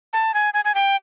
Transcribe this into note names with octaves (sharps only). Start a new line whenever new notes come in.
A5
G#5
G#5
G#5
G5